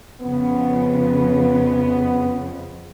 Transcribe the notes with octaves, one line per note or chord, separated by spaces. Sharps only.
F2 C#3 B3